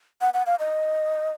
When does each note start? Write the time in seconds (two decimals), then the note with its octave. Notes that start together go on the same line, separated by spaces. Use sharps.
0.21 F#5
0.34 F#5
0.46 F5
0.59 D#5